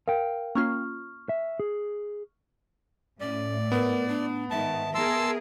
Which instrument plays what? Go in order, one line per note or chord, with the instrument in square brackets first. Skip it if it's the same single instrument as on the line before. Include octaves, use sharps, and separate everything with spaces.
[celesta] A#4 [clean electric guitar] F5 G5
[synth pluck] A#3 C#4 F4 [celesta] C#6 F6
[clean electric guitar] E5
G#4
[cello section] A2 [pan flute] C#4 [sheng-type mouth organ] D5
[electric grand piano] B3 [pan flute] A#4
[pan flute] D4
[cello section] G#2 D#3 [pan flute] E5 [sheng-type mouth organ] A5
[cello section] B3 G#4 A#4 [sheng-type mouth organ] A5 C6 E6